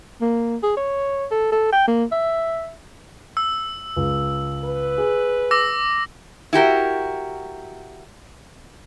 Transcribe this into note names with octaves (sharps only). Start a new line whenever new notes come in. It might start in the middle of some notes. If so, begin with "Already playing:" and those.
A#3
G#4
C#5
A4
A4
G5
A#3
E5
E6
C#2
B4
G#4
D6 E6 A#6
E4 F#4 G4 A#4